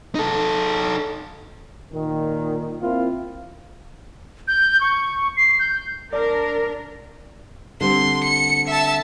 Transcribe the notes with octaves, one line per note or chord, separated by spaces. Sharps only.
D#4 A4
A#2 D#3
A#3 C4 E4 F4
G6
C#6
C7
G6
D4 A#4 D5
D3 G3 C4 C6
C#7
E5 A5